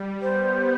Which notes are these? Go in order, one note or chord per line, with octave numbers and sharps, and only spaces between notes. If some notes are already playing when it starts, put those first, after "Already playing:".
Already playing: G3
B3 C5